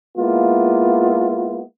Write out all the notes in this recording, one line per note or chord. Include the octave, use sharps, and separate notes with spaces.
G#3 A#3 B3 E4 F4